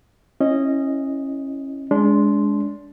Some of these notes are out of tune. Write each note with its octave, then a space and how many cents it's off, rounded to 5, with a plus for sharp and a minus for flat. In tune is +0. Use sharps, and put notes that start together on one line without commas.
C#4 -20 E4 +0 D#5 +0
G#3 +0 D4 -30 C6 +0